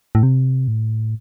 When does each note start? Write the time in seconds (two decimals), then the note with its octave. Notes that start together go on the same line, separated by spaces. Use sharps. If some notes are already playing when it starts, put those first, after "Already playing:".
0.15 A2
0.23 C3
0.68 A2